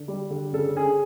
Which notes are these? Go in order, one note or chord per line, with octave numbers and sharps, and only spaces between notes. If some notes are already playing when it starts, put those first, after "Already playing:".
Already playing: D3
G3
D3
C#3 A4
C#3 G#4